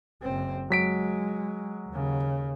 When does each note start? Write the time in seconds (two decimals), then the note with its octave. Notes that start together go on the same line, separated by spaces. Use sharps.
0.22 F#1 C4
0.70 F#3 G#3 B6 D7
1.88 D#2 C#3